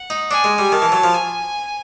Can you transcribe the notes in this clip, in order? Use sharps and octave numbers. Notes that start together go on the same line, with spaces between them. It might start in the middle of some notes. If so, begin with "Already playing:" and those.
Already playing: F#5
D#4
D4 G#5
G#3
G3
D#3 A5
E3
F#3
F3
G#5